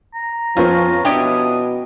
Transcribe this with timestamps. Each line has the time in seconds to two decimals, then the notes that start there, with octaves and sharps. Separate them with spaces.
0.14 A#5
0.57 F2 F3 B3 C#4 F4
1.05 B2 C#4 D4 E4 G4 D#6